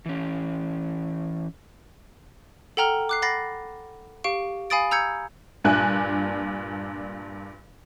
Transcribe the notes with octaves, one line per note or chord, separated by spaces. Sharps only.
E3 C#4
A4 F#5 G5 A#5 F6 G7
D6 F#6 C7
F#5 B5 A6 A#6 C7
G4 F5 C#6 D7
F5 G#5 B5 D#6 A6 D7
A#5 E6 G6 G#6 C#7
G2 A#2 D4 G#5 F#6